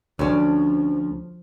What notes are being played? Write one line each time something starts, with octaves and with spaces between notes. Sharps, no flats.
D2 F3 C#4 D4